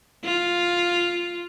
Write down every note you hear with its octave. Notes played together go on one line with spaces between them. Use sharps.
F4